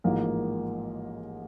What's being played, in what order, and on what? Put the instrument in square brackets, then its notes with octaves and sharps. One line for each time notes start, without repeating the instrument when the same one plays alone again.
[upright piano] A1 G#2 F3 A#3 A#4